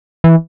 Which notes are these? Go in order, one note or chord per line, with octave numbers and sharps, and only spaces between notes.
E3